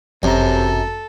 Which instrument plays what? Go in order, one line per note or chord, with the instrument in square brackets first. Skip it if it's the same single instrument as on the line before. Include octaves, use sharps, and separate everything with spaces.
[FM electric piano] G1 A#5 [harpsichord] F#2 [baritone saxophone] C3 [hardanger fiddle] A4